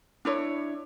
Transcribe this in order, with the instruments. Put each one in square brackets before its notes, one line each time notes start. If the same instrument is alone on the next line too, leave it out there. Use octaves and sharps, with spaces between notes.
[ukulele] D4 E4 C#5